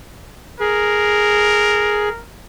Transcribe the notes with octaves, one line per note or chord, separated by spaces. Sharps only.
G#4 A#4